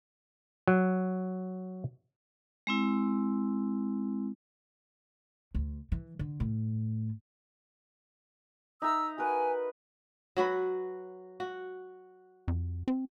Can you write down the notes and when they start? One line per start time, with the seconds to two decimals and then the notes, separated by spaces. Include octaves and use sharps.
0.68 F#3
2.67 G#3 C4 E4
5.55 D2
5.92 E3
6.19 D3
6.40 A2
8.82 D#4 E5 A#5 E6
9.18 F#4 A#4 B4 G#5
10.37 F#3 F#4 B4
11.40 F#4
12.48 F2
12.88 C4